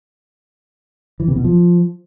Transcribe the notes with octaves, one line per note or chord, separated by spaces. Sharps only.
E3
C3
B2
F3